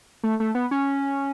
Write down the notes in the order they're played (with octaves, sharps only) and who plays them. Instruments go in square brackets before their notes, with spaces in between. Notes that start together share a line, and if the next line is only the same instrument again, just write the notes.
[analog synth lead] A3
A3
B3
C#4